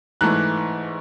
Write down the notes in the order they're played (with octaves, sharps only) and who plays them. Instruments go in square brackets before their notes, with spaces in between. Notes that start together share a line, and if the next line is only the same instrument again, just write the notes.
[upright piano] G#2 E3 A3 F#6